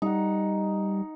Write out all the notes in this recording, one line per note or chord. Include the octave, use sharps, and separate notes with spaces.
G3 D#4 F#5